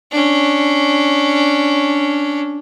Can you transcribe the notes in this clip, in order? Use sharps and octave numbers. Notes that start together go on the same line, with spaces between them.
C#4 D4